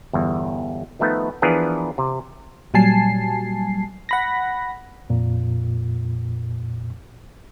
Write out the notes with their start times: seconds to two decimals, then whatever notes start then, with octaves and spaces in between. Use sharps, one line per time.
0.13 G1 E2
0.99 D#3 F3 A3 B3 D#4
1.42 E3 F3 B3 D4 G#4 A#4
1.98 C3
2.74 A#2 F#3 G3 G#5 A5 C7
4.09 F#5 B5 A#6
5.10 F2 A#2